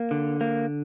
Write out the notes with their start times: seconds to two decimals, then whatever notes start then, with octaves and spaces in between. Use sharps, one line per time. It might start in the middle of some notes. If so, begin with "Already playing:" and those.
Already playing: A#3
0.11 D3
0.41 A#3